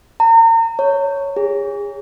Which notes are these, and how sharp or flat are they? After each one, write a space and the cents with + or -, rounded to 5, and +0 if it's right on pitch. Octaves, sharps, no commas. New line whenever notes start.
A#5 -40
C#5 +5
G#4 -35